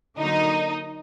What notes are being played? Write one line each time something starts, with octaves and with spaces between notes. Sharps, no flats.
D3 F#3 A#3 D#4